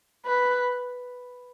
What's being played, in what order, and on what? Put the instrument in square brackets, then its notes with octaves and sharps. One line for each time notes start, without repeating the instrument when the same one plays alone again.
[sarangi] B4